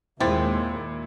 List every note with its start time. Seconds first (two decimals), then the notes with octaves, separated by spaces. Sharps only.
0.20 D#2 A#2 G#3 C4 E4 A6